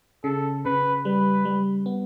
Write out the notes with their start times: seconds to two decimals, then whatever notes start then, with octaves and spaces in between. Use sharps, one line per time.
0.24 C#3 A4
0.65 C#3 B4
1.05 G3 B4
1.45 G3
1.86 B3